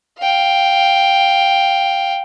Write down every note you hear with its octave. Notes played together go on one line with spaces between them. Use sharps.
F5 G5